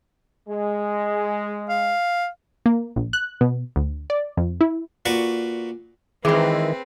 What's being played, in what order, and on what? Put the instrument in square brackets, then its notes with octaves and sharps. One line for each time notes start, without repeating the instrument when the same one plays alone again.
[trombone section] G#3
[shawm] F5
[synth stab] A#3
A#1
F#6
B2
D2
D5
F2
E4
[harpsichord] A#2 F#4 B4 D5 C#6
[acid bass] D#3 [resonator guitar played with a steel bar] E3 G#3 [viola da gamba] C4 B4 [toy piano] G#4 B5